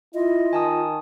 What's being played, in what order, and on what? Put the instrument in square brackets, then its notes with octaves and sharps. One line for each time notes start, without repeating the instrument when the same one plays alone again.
[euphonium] E4 [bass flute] F4 [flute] D#5
[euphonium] D#3 [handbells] G#5 A5 D#6